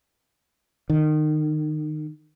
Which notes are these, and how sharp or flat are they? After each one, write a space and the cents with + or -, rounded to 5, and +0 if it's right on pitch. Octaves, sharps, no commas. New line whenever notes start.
D#3 -25